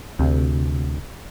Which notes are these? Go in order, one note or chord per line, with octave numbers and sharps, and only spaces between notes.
D2 C3